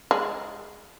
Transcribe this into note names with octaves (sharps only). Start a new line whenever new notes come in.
G#3